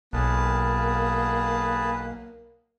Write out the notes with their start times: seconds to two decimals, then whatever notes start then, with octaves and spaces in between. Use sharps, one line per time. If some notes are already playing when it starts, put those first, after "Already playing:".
0.13 B1 A#3 G#4 B4 A5